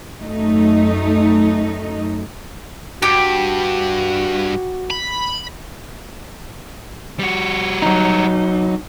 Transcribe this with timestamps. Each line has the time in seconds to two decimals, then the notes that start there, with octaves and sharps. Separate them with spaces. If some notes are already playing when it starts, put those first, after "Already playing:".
0.20 F#2 A3 D#4
3.02 G2 F#4 G4
4.90 B5
7.19 G3 F#4
7.82 F#3 D#4